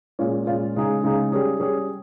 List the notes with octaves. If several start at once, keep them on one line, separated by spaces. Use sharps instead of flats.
A#2 G#3 C#4 F4
A#2 G#3 C#4 F4
C#3 G#3 D#4 G#4
C#3 G#3 D#4 G#4
G3 C#4 G#4
G3 C#4 G#4